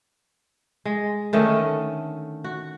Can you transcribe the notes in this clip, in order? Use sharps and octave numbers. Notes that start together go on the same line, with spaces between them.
G#3
D3 D#3 A3 C#4
F#4